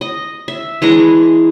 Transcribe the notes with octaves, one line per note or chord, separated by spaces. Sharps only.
D#5
E5
E3 G#3 D4 A#5